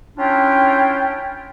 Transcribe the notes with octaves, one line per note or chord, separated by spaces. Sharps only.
C#4 D4 E4 F4 G5